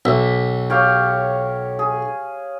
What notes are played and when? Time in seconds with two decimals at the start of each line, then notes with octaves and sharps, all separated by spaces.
0.05 B1 E5
0.70 G4 C#5 F5
1.79 G#4